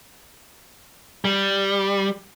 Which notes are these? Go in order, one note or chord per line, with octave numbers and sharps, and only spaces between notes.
G3